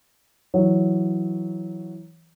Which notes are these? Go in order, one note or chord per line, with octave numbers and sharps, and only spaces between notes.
E3 F#3 C#5